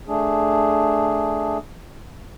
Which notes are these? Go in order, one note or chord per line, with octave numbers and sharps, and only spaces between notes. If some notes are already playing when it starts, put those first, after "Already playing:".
A3 D4 G#4